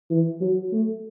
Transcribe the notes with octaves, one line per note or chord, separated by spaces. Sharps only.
E3
F#3
A3